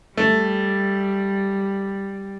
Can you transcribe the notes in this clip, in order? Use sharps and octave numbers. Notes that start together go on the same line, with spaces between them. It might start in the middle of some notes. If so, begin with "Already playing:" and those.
G3 A3